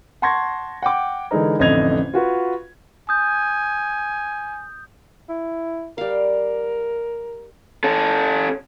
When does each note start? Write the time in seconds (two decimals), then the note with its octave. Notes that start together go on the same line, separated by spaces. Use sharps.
0.22 F#5 A5 C6 C#6 G#6 A#6
0.82 F#5 G5 D6
1.31 D3 E3 G#3 D#4 A#4
1.59 A1 F2 D3 D#5 G#6 F7
2.14 F4 F#4 B4
3.09 G#5 D#6 G6
5.29 E4
5.98 G3 A#4 F5
7.84 C#4 A4